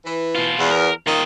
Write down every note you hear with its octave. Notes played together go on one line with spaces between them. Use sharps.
E3
B2 F4
E2
A#4
D#2 D#3 F4 D#5